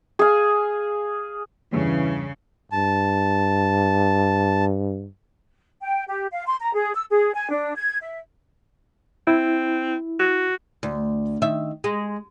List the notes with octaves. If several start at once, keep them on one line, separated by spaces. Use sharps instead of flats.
G#4 F5
E2 G2 C#3 E3 C#4
G2 A5
G5
G4
F5
C6
A#5
G#4
E6
G#4
G#5
D4
G#6
E5
C4 E4
F#4
D2
D#3 E5
G#3